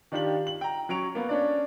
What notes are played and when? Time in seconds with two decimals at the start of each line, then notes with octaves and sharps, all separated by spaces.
0.12 D#3 D4 F4 G4 F#7
0.47 F#7
0.61 G5 A#5
0.89 F#3 C#4 C#6 D7 F7
1.15 A#3 B3
1.29 C#4 D4 D5